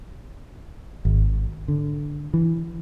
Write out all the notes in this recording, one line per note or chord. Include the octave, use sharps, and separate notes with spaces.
G#1
D3
E3